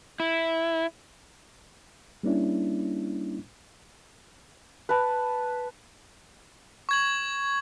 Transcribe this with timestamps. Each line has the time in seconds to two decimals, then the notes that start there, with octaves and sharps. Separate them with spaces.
0.20 E4
2.23 G3 A#3 C#4 D4 E4
4.89 B4 A5
6.89 C#6 G#6 F#7